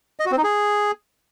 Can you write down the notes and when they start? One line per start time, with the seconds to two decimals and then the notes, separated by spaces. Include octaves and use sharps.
0.20 D#5
0.26 F#4
0.32 C4
0.38 D#4
0.44 G#4